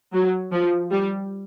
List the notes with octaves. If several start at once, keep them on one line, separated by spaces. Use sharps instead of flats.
F#3
F3
G3